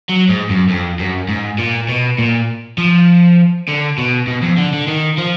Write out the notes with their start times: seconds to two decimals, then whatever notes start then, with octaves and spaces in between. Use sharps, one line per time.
0.09 F#3
0.29 G#2
0.49 F#2
0.69 F2
0.99 F#2
1.29 G#2
1.58 A#2
1.89 B2
2.19 A#2
2.78 F3
3.68 D3
3.98 B2
4.27 B2
4.42 F2
4.57 D3
4.73 D3
4.87 D#3
5.18 F3